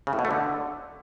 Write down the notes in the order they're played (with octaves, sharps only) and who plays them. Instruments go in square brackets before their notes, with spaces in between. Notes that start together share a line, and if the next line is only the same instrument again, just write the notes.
[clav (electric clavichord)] C#3
A2
B2
A3
D3